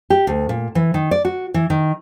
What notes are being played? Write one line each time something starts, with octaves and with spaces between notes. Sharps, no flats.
G4
D2
A#2
E3
D#3
D5
F#4
E3
D#3